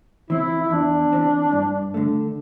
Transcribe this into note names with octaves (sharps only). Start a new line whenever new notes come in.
E3 C4 E4
E4
E2 D4
E3 C4
G2
D3 A3